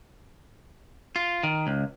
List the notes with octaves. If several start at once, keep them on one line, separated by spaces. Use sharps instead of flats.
F4
D#3
C#2